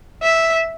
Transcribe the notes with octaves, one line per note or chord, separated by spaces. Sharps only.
E5